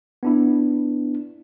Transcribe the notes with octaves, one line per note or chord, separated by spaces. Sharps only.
B3 D4 E4